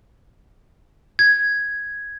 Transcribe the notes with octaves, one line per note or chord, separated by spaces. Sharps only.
G#6